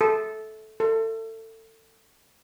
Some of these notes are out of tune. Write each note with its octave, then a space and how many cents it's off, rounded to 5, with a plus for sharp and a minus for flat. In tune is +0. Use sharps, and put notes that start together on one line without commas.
A4 -15
A4 +25